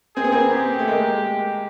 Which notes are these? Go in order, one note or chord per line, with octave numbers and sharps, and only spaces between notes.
C4 G#4
B3
A#3 C4
G4
A3
G#3 A#3